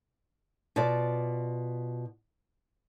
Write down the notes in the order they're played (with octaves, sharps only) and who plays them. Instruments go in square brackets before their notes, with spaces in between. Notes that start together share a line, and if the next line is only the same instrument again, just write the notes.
[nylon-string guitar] B2 F4 D5